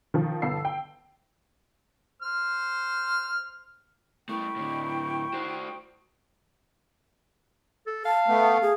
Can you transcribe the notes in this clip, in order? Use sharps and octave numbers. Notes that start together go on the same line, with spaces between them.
D#3 F3
G1 B3 F5 A5 E6 C7
G5
C5 F6
A3 B3 E4 G5 B5 C#6
A2 D3
F#4 C5
A4
F5 A5
A3 B3
G#4